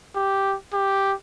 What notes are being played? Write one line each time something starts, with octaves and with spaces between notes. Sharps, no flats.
G4
G4